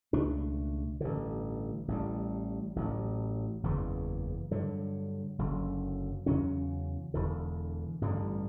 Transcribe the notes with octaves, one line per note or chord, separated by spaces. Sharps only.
C#2 B2 A3 D4
A1 G2 D3
A1 A2 G3
A1 A2 F#3
F#1 E2 C#3 E3
G2 D3 F#3
F#1 F#2 D3 F#3
E2 C#3 F#3 C#4
E1 E2 D3
A1 G2 D3 G3